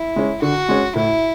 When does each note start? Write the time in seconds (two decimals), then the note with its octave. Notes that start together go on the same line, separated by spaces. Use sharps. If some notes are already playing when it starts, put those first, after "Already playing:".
Already playing: E4
0.16 G#3 C#4
0.42 D3 F#4
0.69 G#3 C#4
0.96 A2 E4